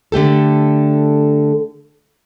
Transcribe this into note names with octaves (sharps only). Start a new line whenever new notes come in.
D3 A3 G4 A4